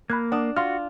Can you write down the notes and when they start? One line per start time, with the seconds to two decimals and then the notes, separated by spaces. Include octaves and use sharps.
0.10 A#3 B5 F#6 G#6
0.32 D4 F#5 D#6
0.56 F4 F#4 C6 F6